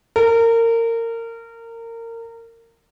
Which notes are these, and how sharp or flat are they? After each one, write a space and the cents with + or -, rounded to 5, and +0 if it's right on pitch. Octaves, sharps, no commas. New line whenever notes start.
A#4 -25